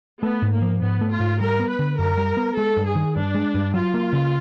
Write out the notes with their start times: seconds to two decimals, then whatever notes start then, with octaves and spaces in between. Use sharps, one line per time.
0.23 A3 B3
0.42 G#2
0.52 A#3
0.62 F3
0.81 G#2 B3
1.01 A3
1.11 F4
1.20 G#2
1.40 G3 A#4
1.60 B3
1.70 B4
1.79 D3
1.98 F#2 A#4
2.17 G3
2.37 B3
2.56 G#3 A4
2.77 G2
2.86 G#4
2.95 D#3
3.16 G2 D4
3.35 G#3
3.54 G2
3.74 F#3 F4
3.94 A#3
4.13 C#3